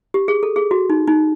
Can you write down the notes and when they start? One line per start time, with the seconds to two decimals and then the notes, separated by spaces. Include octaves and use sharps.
0.14 G4
0.28 G#4
0.43 A4
0.56 G#4
0.71 F#4
0.90 D#4
1.07 D#4